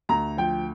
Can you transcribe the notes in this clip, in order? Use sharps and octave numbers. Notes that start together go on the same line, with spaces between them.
D2 A#5
F3 G5